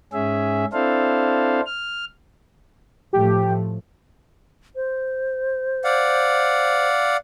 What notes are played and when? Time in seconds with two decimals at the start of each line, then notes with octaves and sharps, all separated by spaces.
0.13 G#2 C#4 G#4 E5
0.73 C4 D4 E4 A4 C5 F5
1.66 F6
3.13 A2 F3 A3 G4
4.76 C5
5.84 D5 F5 F#5